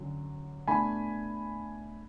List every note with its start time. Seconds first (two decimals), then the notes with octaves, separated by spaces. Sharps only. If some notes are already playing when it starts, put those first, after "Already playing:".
Already playing: D3 F#3 C#4
0.67 B2 A3 D4 G#5 B5